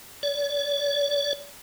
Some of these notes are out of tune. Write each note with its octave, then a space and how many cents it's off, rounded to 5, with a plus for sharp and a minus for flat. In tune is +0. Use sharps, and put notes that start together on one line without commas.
D5 -45